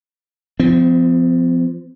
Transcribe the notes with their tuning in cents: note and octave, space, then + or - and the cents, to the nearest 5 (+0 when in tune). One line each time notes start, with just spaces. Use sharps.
F3 -10 C4 -45